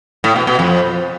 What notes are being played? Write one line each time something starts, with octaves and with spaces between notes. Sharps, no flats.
A2
B2
B2
F2